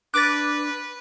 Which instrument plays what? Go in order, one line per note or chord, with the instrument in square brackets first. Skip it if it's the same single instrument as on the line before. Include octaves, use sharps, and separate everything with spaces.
[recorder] D4 [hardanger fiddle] B4 [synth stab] D6 [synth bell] F#6 A6